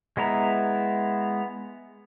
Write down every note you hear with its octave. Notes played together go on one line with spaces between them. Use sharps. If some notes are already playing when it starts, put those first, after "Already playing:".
G#3 B3 E4 A#5